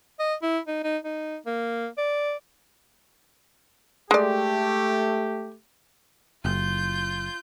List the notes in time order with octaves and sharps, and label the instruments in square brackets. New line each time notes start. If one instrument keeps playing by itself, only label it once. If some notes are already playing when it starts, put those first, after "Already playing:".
[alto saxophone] D#5
E4
D#4
D#4
D#4
A#3
D5
[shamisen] G#3 D5 [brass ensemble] A3 G4
[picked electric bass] F#1 [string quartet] F4 G6